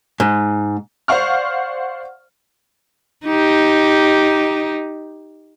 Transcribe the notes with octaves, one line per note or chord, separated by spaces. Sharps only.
G#2
C5 D5 F5 F#5 C#6 F6
D#4 G4